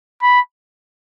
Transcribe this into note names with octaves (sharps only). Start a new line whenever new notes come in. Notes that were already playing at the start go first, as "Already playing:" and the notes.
B5